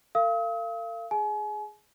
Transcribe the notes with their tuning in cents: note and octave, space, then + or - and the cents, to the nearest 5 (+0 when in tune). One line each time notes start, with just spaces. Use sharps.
A4 +40 F5 -30 D#6 +45
G#4 +0 G#5 +35